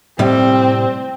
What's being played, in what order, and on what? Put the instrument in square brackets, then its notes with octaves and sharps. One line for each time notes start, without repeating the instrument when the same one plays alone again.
[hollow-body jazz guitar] A2 C3 G3 [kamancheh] C4